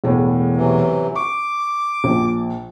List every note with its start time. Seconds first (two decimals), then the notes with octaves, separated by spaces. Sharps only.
0.04 E1 E2 A2
0.57 C3 E3 F#3
1.15 C#6 D6
2.04 A#1